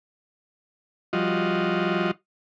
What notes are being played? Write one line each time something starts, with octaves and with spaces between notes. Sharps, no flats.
F3 G3 F4 F#4 D#5